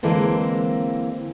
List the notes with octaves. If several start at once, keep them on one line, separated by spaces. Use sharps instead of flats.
D3 E3 G#3 A#3 C4